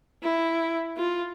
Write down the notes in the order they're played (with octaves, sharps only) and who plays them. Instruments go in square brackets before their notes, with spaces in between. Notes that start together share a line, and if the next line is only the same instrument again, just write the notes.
[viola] E4
F4